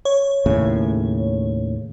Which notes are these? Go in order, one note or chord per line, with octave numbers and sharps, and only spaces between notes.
C#5
D#2 A2 C#3